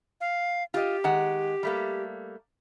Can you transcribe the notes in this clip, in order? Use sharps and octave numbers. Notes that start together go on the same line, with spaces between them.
F5
F4 G4 D#5
D#3 G#3 F#5
G3 A3 A#3